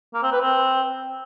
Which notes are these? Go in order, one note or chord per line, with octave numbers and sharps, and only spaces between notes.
A#3
C4
B4
C4